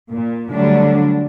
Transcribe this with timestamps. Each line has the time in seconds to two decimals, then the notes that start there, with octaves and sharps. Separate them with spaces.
0.11 A#2
0.49 D3 F#3 G3 A3 D4